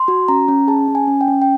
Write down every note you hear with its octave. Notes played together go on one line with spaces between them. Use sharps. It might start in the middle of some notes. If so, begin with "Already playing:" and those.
Already playing: C6
F#4
C#4 A#5
C#4
G#4 A5
C#4
G#5
C#4
G5
C#4
G5